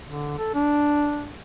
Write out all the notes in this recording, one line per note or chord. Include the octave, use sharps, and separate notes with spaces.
D3
A4
D4